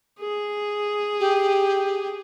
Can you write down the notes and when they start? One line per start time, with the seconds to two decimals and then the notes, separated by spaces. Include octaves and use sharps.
0.20 G#4
1.20 G4